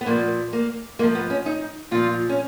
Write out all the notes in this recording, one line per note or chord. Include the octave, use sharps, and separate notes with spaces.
B3
A#2 F3 A#3
A#3
G#2 F3 A#3
B3
C#4
D#4
A#2 F3 F4
C#4